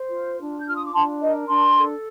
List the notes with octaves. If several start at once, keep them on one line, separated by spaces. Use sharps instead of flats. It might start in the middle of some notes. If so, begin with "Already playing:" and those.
Already playing: C5
F4
D4
G6
F4 F6
D#6
D6
D4 A5 C6
A#4 D#5
D4 A5 C6
A4